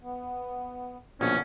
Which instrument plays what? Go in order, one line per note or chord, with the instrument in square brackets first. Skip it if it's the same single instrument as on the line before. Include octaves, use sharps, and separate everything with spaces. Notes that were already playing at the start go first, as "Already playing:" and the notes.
[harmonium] B3
[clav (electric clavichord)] A#1 [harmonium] E2 D3 A#3 [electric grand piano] B2 [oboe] C#4